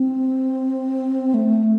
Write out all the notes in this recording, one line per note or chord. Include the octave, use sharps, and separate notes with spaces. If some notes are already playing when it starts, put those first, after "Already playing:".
Already playing: C4
A3